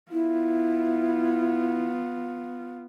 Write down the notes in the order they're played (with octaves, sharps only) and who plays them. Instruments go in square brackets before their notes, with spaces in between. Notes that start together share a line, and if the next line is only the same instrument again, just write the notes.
[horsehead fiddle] B3 F4 [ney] E4